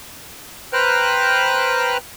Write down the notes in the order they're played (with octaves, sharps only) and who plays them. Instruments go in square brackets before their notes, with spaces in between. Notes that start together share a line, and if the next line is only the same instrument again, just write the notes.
[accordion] B4 C5 G5 A#5 F6 F#6